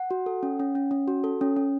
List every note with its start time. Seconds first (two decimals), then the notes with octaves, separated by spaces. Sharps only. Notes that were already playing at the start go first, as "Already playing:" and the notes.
Already playing: F#5
0.11 F#4
0.26 A4
0.43 C#4
0.60 C#4
0.75 C#4
0.91 C#4
1.08 F#4
1.24 A4
1.41 C#4
1.56 C#4